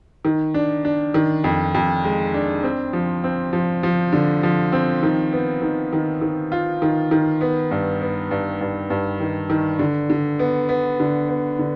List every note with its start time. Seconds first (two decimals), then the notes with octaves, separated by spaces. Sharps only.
0.25 D#3
0.54 D4
0.85 D4
1.14 D#3
1.44 F2
1.74 F2
2.04 G#3
2.34 D4
2.63 C4
2.93 F3
3.24 C4
3.53 F3
3.83 F3
4.13 D3
4.43 F3
4.72 C4
5.03 D#3
5.33 B3
5.62 D#3
5.93 D#3
6.21 D#3
6.52 F4
6.82 D#3
7.11 D#3
7.41 B3
7.71 G2
8.01 B3
8.31 G2
8.61 G2
8.90 G2
9.20 D#3
9.50 D#3
9.79 D3
10.10 D3
10.39 B3
10.69 B3
11.00 D3
11.29 B3
11.59 D3